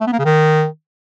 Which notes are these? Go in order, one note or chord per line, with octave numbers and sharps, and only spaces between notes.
A3
B3
A#3
C#3
D#3